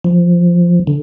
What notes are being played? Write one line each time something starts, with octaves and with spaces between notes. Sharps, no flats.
F3
D3